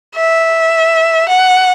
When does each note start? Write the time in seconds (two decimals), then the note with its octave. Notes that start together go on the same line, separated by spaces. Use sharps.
0.15 E5
1.28 F#5